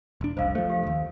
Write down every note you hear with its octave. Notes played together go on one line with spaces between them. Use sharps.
E1 D4
F1 C2 C5 D#5 F5
F3 A3 C5
G4 F5
D#1 D#2 A4